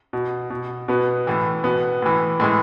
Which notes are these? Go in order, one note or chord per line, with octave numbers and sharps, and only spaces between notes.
B2
B2
B2 B3
A2 E3
B2 B3
A2 E3
A2 E3 G#3